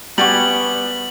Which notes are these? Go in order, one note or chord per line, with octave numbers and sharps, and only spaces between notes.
G3 B3 F#4 G#5 C#6 F#7